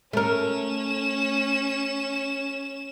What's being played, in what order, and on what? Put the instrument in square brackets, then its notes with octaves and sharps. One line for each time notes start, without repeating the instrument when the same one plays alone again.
[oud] A3 A#4 [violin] C#4 E7